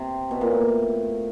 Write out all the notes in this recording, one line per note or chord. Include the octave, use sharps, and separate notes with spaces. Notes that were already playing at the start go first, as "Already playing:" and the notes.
Already playing: C3
B2
A#2
A2